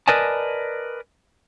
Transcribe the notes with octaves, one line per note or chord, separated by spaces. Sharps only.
A#4 B4 D5 D#5 G#5 A5